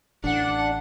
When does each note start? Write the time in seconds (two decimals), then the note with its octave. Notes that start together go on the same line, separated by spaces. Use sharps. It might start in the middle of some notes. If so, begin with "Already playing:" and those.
0.24 A1 E3 D4 F#5